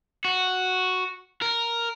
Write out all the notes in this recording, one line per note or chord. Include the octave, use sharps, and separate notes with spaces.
F#4
A#4